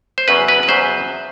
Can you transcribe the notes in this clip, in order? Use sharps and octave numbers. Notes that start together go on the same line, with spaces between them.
C5
E2 C#3 F#3 B4
B4
B4
E2 C#3 F#3 C5